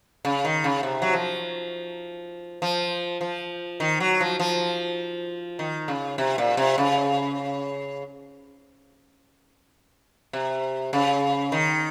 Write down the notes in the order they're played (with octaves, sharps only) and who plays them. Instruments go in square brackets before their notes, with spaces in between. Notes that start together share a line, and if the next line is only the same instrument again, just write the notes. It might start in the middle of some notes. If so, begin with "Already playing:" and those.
[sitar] C#3
D#3
C#3
C3
F#3
F3
F3
F3
D#3
F#3
F3
F3
D#3
C#3
C3
A#2
C3
C#3
C3
C#3
D#3